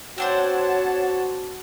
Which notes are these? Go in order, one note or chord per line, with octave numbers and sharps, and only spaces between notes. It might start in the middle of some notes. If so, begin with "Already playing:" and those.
C4 D4 F#4 C5 C#5 F#5 A5